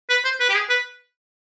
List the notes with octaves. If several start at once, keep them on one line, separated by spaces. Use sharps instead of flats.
B4
C5
B4
G4
G#4
B4